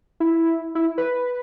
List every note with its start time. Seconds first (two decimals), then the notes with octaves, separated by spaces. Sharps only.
0.20 E4
0.75 E4
0.98 B4